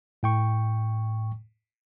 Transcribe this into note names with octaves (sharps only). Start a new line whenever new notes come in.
A2 G5 C#6